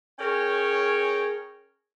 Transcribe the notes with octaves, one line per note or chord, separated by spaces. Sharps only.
C#4 G#4 A#4 C#5 G5